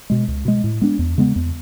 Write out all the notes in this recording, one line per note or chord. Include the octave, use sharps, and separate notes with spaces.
B2 G#3
C#2
B2 G#3
A2
G#3 B3 D4
E2
C#3 G#3 B3
E2